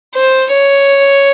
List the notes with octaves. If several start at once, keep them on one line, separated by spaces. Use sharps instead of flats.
C5
C#5